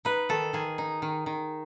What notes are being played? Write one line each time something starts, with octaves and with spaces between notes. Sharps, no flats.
D#4 B4
D#3 A4
D#3 G#4
D#4
D#3
D#3